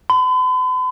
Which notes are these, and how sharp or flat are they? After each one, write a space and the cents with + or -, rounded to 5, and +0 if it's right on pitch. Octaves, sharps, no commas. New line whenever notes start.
B5 +45